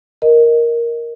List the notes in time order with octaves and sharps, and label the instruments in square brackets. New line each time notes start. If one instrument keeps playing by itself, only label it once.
[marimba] A#4 D#5